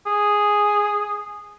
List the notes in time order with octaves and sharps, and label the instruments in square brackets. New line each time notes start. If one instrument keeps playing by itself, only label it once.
[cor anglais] G#4